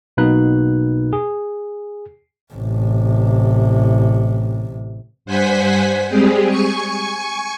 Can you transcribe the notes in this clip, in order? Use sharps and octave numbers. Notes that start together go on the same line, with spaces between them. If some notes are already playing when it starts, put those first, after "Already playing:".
B1 B2 A#3 D#4 B4 F#6
G#4
A1 C3
G2 C5 F#5 G#5 B6
G3 G#3 C4 G4 G#4
G#5 C#6 C#7